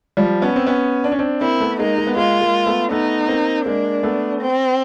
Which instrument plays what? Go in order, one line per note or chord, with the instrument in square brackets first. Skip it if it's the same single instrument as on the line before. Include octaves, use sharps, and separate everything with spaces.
[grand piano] F3 G3
B3 C#4
C4
B3 C#4
D4
C#4
C4 D4
[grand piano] A#3 C4 [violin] E4
[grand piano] A3 B3
[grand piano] G#3 A#3 [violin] D#4
[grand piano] G#3 A#3
B3
[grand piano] G#3 A#3 [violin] F4
[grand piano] G#3 A#3
A3 B3
[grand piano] A3 B3 [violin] D#4
[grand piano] A#3 C4
[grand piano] G#3 A#3 [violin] D4
[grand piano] A3 B3
[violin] C4